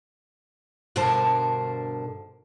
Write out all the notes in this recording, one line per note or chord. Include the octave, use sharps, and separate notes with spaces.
G2 B2 D3 A#4 C5 A5